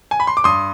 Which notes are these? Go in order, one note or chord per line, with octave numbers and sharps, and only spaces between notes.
G#5
B5
C6
D6
G2 C6 D#6